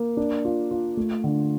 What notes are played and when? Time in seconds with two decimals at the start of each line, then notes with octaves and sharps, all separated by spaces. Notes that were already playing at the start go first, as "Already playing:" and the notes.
Already playing: A#3
0.17 D4
0.45 F4
0.71 F4
0.97 A3
1.24 D3